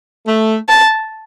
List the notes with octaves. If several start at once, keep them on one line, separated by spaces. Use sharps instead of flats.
A3
A5